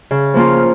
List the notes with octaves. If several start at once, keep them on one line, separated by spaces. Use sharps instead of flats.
C#3
F3 A#3 C#4 F4